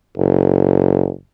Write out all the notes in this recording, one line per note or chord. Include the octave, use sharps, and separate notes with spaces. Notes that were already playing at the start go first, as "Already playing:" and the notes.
F#1